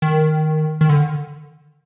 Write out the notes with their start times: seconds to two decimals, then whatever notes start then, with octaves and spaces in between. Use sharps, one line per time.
0.02 D#3
0.81 D#3
0.89 D3